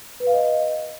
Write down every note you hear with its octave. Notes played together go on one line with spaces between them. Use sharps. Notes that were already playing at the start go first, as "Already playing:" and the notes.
B4
F5
D#5